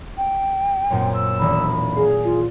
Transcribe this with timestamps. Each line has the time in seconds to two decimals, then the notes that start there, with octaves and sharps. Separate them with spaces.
0.18 G5
0.90 F#2 A#2 C4
1.13 E6
1.39 E1 D#3 D#4 B5
1.96 G#4 F5
2.24 F4